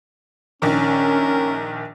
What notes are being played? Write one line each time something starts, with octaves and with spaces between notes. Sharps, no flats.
A#1 D#3 C#4 A#4